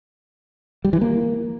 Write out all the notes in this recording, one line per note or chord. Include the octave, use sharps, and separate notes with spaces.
G3
E3
A#3